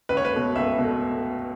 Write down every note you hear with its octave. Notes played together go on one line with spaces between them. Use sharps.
C#2 B4
C#5
B4
B2 A3
C#2 E5
B2
A3